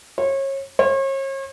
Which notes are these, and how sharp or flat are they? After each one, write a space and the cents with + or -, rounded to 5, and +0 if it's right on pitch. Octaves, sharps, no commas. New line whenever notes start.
C#5 -30
C#5 -40